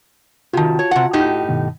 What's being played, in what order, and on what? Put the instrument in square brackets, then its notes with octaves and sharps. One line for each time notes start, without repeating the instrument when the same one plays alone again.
[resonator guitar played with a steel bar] C3 D#3 [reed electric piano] F4 F#4 A5
[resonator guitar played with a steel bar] C#5
C3 F#5
A2 D#4 G4
[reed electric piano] G2 B2 D#3